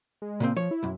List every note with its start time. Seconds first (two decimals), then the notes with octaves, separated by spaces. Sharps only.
0.22 G#3
0.40 A#2 C#3 A#3 C4
0.57 F3 C#5
0.71 E4
0.83 B1 F#2